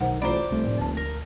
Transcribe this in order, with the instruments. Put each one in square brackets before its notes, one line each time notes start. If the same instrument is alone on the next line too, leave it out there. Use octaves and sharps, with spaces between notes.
[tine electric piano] B1 [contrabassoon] D#3 [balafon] C5 F#5
[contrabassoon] A1 [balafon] F4 A#5 B5 [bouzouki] C5 D5
[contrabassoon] F1 [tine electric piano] C2 A3
[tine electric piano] A2
[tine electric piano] D2 [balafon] A#3 A5
[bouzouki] A#4